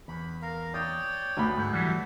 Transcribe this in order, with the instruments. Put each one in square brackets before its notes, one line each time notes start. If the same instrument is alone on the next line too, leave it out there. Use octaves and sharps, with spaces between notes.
[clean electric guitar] E2 [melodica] B5
[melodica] A#4 F5
[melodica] C#5 D5 G5 [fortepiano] D#6
[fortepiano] D2 B5 [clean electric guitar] B3
[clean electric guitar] G#2 [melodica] A3 B3
[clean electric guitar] E3 F#3 G3